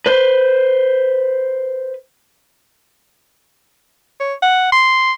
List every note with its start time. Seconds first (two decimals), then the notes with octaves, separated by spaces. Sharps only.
0.06 B4 C5
4.20 C#5
4.42 F#5
4.72 C6